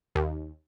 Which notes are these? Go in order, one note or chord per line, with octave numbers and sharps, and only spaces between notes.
D#2